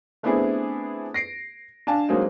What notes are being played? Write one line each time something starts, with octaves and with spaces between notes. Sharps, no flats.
A3 B3 C4 D4 E4 G#4
A#6 C7 D7
D4 F5 G#5 A5
F#3 G#3 A#3 C4 D#4